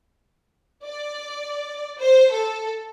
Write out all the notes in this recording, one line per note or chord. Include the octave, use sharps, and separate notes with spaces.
D5
C5
A4